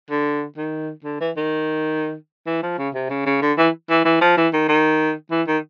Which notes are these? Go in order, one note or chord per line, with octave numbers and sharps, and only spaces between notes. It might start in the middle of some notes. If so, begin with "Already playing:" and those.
D3
D#3
D3
E3
D#3
E3
F3
C#3
C3
C#3
C#3
D3
E3
E3
E3
F3
E3
D#3
D#3
E3
D#3